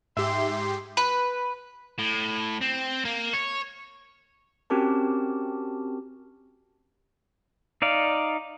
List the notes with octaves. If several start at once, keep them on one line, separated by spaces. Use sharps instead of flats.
G#2 G4 E5 C6
B4
A2
C4
A#3
C#5
C4 C#4 F#4 G4 A#4 A5
D#4 D5 F5